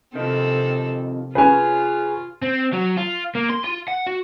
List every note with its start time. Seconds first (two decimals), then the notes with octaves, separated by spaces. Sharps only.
0.16 F2 C3 D#3 C4 A4
1.35 F4 G#4 B4 C#5 G#5
2.42 C4
2.73 F#3
2.97 F4
3.35 A#3
3.50 C6
3.64 F4
3.88 F#5
4.06 F#4